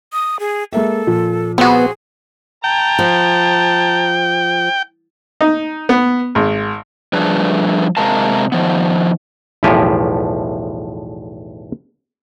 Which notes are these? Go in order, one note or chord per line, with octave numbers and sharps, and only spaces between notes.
D#6
G#4
G#3 A#3 A4 E5
A#2 F3
B3 C4 F#4 G#4
G5 A5 A#5
F3
D#4
B3
G#1
F3 G3 A3 D4 G#4 B4
C3 G#3 A#4 F5 A5
D#3 F3 B3
B1 E2 A2 F3 G4 G#5